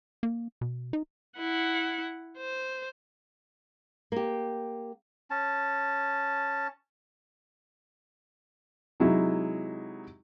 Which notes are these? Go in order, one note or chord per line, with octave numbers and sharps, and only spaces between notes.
A#3
B2
D#4
E4 F#5
C5
A#3 G4
C#4 A5
C3 F#3 G#3 D#4 E4